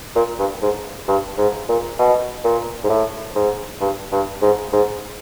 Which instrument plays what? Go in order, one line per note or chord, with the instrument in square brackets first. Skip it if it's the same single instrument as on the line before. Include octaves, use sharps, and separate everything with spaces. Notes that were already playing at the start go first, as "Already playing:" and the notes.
[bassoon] A#2
G2
G#2
G2
G#2
A#2
B2
A#2
G#2
A2
G#2
G2
G2
G#2
G#2